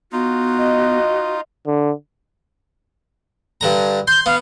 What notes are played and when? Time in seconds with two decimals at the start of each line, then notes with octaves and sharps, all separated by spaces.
0.12 B3 D#4 F4 F#4
0.58 D#5
1.67 D3
3.61 G2 D3 A#5
4.08 C6 G6
4.26 B3 F5